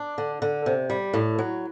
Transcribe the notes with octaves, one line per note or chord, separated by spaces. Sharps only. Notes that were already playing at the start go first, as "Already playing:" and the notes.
Already playing: D4
D3
D3
C3
G3
A2
F#3